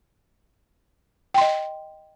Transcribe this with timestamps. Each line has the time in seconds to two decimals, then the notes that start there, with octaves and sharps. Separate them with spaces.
1.34 G5
1.38 C6
1.41 D#5